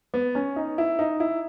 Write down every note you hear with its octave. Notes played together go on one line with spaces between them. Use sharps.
B3
C#4
D#4
E4
D#4
E4